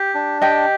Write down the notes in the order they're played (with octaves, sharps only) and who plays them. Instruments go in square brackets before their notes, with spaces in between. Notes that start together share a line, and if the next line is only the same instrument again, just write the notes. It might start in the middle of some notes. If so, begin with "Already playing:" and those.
Already playing: [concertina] G4
D4
[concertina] G4 [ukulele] D#5 G5